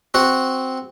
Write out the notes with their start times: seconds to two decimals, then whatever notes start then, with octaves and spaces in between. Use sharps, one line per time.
0.14 C4 F#4 F#5